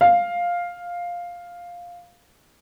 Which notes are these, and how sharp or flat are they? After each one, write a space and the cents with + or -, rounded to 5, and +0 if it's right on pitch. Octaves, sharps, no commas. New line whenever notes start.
F5 +5